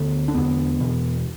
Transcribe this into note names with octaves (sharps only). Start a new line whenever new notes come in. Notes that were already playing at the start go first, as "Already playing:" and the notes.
Already playing: D2 D3 B3
D4
E2 D3 B3
E2 B2